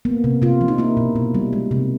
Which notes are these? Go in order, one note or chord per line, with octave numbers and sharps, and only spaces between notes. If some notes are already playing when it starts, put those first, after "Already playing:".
A#3 B3
C3
C3 F4
F3
D#4
A#3 E4
B2
B2
G3
G#3
C3